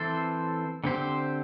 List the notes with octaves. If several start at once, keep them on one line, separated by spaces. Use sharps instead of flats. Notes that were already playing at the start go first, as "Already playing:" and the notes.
Already playing: E3 C4 A4 C5
D3 C4 G4 C5